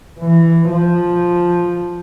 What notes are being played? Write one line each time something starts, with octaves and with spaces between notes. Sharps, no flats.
E3
F3